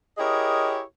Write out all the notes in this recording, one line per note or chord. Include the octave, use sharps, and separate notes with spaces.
E4 G4 G#4 A#4 C#5 D#5